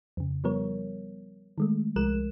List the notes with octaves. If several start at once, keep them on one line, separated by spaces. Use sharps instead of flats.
F2 C#3
F3 G3 B3 A#4 C#5
D#3 G#3 A3
C2 F3 G#3 A#4 F#6 E7